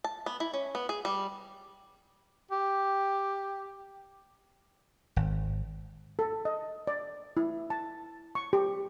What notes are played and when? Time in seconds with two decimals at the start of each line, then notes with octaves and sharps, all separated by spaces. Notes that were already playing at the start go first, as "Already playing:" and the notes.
0.04 A5
0.26 B3
0.40 E4
0.54 C#4
0.75 B3
0.89 G#4
1.05 G3
2.51 G4
5.16 G#1
6.19 A4
6.45 D#5
6.87 D5
7.37 E4
7.70 A5
8.35 C#6
8.53 G4